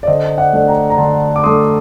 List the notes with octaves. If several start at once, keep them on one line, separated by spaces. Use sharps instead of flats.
D5
D3 C5 D#5
D5 F#5
A3 D4
G5 A#5
A#5
D3 A5 C6
D6
A3 D4 C6 D#6